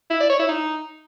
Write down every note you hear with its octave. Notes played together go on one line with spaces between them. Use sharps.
E4
D5
C#5
E4
D#4